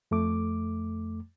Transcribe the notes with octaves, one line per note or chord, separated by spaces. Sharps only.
F2 A3 D6